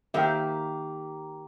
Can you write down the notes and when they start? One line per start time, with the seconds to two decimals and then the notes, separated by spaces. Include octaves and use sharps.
0.14 D#3 A#3 G4 E5 F5 G5